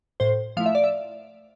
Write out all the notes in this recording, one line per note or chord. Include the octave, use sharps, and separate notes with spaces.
A2 C5
F3 A3 E4 F5
E5
D5
E5